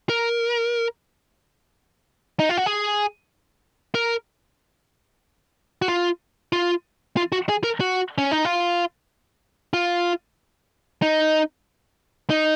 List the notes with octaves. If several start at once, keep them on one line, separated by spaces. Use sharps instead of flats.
A#4
D#4
F4
F#4
G#4
A#4
F#4
F4
F4
F4
F#4
G#4
A#4
F#4
C#4
D#4
F4
F4
D#4
D#4